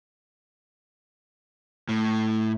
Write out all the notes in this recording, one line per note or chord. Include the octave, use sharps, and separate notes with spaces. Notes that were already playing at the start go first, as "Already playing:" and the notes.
A2